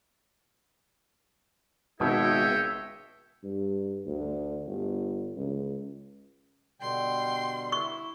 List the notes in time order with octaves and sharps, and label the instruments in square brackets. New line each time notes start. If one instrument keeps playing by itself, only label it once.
[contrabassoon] G#1 [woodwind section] C#2 G#4 E5 [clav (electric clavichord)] B2 [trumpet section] D#4 C#5 G5
[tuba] G2
D2
G1
C#2
[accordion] B2 D3 G3 [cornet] G5 [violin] C6
[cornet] E4 [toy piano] C#6